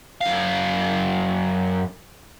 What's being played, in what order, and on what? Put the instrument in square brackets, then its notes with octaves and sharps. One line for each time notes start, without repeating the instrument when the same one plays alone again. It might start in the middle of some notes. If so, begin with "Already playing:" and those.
[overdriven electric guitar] F#2 F5